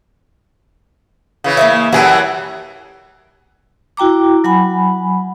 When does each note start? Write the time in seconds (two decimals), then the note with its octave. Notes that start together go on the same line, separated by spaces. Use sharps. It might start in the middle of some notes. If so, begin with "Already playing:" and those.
1.44 C#3 E3
1.57 A#3 D#5 E5
1.93 F#2 E3 G3 F#4 G#4 A4
3.97 E4 F#4 G5 A#5 D6
4.44 F#3 F#5 G#5 B5